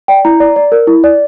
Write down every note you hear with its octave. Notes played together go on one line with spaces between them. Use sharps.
D5 G5
E4 A#5
D5
D5
A#4
E4
D5